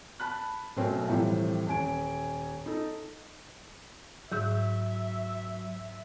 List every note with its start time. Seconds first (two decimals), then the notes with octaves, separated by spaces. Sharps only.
0.20 A5 B5 F#6
0.77 B2 F#3 A3 C4 C#4 A#4
1.09 A2 C3 E3 F3 G3
1.66 D#1 G#5 D7
2.66 D#4 A4
4.31 G#2 F#3 G#4 E5 G6